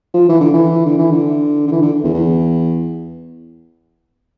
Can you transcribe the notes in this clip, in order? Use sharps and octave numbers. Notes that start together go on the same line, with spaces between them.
F3
E3
D3
E3
D3
E3
D3
D3
E3
D3
E2
E2